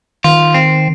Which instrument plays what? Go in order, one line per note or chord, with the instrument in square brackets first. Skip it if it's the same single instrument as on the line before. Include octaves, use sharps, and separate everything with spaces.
[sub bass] D#3 [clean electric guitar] F4
[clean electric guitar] C4